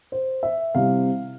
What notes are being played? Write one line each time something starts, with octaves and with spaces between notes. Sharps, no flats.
C5
E5
C3 G3 C4 E4 F5